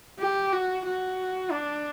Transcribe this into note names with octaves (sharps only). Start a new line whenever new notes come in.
G4
F#4
F#4
D4